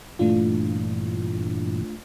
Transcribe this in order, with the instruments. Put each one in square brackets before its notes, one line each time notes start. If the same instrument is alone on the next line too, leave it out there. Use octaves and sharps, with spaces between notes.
[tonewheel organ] G2 A#2 E3 [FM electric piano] A3 D4 F4